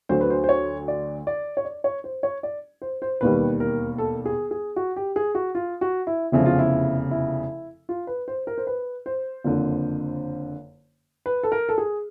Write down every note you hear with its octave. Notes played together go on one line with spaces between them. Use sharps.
D2 D3 F#3 C5
B4
C5
C5
C#5
D5
D5
C#5
D5
C#5
C5
C#5
D5
C5
C5
E1 D#2 D#3 G3 B4
A#4
A4
G#4
G#4
F#4
G4
G#4
F#4
F4
F#4
E4
F1 E2 C#3 F3 E4
F4
E4
E4
F4
B4
C5
A#4
C5
B4
C5
F#1 F2 D3
B4
A4
A#4
A4
G#4